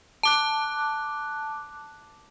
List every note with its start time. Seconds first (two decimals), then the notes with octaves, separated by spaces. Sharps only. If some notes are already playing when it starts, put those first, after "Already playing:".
0.23 A5 D6 F#6